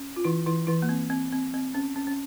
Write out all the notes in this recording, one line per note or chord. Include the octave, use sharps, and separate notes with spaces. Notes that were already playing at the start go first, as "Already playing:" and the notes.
Already playing: C#4
F4
E3 E4
E3 E4
E3 E4
A#3
C4
C4
C4
C4
C#4
C#4
C#4